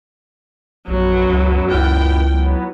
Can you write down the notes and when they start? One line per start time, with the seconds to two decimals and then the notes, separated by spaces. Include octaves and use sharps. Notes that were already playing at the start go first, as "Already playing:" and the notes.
0.88 A#1 F#2 F#3 B3
1.30 C#2
1.71 C#2 E4 F4 G5
2.26 F#3 B3